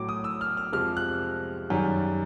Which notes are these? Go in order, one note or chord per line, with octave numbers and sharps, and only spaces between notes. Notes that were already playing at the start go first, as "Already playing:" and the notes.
Already playing: A2 F#3 D6
D#6
E6
F6
F6
F2 C3 F3 G#3 F6
F#6
F#2 D#3 G3